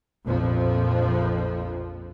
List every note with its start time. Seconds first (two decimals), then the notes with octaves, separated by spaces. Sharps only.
0.25 A#1 F2 F3